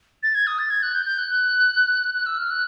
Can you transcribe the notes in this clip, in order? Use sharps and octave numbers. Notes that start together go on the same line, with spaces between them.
A6
G#6
D#6
A6
G#6
F#6
G6
G6
F#6
F#6
E6
F6
F#6